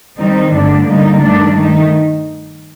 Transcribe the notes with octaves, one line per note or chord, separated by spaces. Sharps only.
D#3 G3 C4 D#4
G2 D3 A3 D4
D3 G3 A#3 D#4
G2 D#3 A3 D4
D#3 A3 D#4